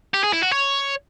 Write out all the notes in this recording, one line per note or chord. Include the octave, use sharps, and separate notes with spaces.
G4
G#4
E4
F#4
C#5